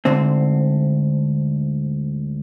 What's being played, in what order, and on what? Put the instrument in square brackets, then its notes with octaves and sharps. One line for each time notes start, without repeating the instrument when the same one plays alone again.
[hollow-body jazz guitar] D2 G#2 D3 C4